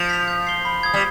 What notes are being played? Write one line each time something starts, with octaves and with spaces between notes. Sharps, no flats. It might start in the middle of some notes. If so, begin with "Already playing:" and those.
Already playing: F3
B6 F7
G6
C7 G7
B5
D#6 G#6
G3